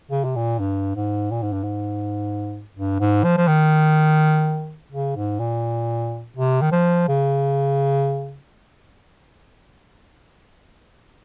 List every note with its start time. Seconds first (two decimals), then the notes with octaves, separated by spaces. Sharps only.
0.11 C#3
0.25 C3
0.36 A#2
0.59 G2
0.96 G#2
1.31 A#2
1.43 G#2
1.52 G2
1.63 G#2
2.76 G2
3.00 G#2
3.24 F3
3.37 F3
3.47 D#3
4.92 C#3
5.16 G#2
5.39 A#2
6.36 C3
6.61 D#3
6.71 F3
7.08 C#3